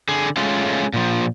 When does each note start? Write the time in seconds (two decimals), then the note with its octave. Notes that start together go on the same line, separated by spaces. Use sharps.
0.09 D3 G#4
0.37 G#3 A3 C#4 F4
0.94 A#2 F3